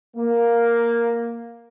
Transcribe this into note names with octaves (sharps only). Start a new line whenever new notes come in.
A#3